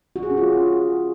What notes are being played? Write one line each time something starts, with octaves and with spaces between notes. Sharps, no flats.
F#4
G#4
C#4
F4